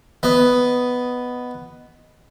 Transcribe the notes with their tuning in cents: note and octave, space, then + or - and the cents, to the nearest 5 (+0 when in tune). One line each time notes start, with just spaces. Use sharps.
B3 +5 D#5 -5